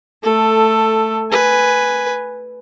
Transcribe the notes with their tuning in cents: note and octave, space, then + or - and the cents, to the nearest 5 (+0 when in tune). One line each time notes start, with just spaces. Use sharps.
A3 +0 A4 +10
B4 +0 G#5 +0